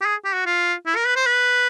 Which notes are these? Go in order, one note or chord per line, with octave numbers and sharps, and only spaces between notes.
G4
G#4
G4
F#4
F4
E4
A#4
B4
C5
B4